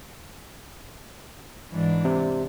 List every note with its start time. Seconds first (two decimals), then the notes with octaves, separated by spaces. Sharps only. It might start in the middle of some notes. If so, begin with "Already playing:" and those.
1.72 G#2 E3 D4
2.05 C3